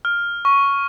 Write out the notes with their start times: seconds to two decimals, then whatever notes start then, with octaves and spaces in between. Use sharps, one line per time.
0.05 F6
0.45 C#6